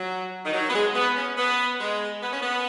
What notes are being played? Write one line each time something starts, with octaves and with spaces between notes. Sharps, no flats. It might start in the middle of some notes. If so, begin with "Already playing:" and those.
Already playing: F#3
D#3
F#3
B3
G#3
B3
C#4
B3
G#3
B3
C#4
B3